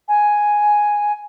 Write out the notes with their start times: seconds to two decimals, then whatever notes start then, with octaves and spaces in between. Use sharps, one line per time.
0.08 G#5